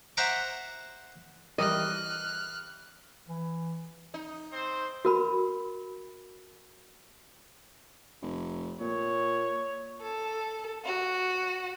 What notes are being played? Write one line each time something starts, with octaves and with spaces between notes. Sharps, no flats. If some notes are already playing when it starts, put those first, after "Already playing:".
C5 E5 F#5 A#5 C#6 D6
E3 G3 A#4 D#5 F6 F#6
E3
D#4
C4 C5
F#4 A#4 B5
F1
A#2 C#5
A4
F#4